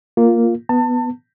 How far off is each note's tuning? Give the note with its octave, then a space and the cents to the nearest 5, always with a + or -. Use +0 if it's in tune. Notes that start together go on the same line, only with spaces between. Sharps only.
A#3 +0 F4 +0
B3 +0 A5 +30